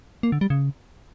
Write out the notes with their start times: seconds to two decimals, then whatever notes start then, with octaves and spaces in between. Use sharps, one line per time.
0.23 A#3
0.32 D3
0.41 G3
0.50 C#3